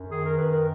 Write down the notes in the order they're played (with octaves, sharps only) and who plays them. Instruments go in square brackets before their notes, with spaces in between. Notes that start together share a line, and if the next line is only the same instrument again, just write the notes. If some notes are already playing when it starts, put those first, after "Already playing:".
Already playing: [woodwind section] F#2
D#3 G#4
A#4
F#2 B4
A#4